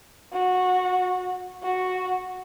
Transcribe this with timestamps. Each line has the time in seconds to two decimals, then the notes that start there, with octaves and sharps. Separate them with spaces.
0.33 F#4
1.62 F#4